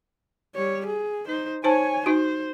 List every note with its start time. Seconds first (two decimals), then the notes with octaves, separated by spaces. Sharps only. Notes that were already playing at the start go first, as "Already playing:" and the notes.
0.55 G3 C#5
0.86 G#4
1.28 D#4 C5
1.64 D#4 C5 C#5 G#5 A5
2.06 D#4 F#4 C5